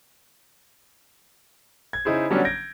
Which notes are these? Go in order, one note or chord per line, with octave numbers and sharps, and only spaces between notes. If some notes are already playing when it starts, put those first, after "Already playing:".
G#6
C#3 D#4 E4 G#4 C5
D3 F#3 G3 B3 C#4 D4
G6 G#6 A#6 D7